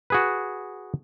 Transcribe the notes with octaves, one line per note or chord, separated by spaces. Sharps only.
F#4 G#4 B4